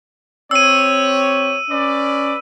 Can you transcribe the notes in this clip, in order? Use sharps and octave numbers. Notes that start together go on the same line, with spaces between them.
C4 G4 C#5 E6 D#7
C#4 B4 D5